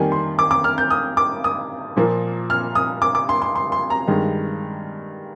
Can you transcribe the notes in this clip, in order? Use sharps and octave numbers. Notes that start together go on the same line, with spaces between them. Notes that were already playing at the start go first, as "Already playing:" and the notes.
Already playing: F2 D#3 G3 A#3 G#5
C6
D6
D6
F6
G6
D#6
D6
D#6
A#2 F3 A#3
F6
D#6
D6
D6
C6
C6
C6
C6
A#5
G2 D#3 G#3